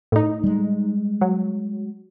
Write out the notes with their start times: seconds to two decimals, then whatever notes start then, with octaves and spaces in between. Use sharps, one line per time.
0.12 A2 D#4
0.44 G3 G#3
1.21 F#3